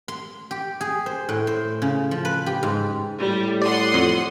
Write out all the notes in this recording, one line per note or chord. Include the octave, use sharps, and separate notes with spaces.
C6
G4
G#4
C5
A2
C5
C#3
F3
B4
G4
G#2
A2 G3
D5 F#5 C6 D#6
F2